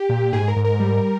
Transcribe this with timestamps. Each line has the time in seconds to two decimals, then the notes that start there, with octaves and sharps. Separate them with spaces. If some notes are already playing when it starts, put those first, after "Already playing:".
Already playing: G4
0.09 A#2
0.32 G#2 G#4
0.48 A#4
0.56 G#2
0.65 A#4
0.80 G3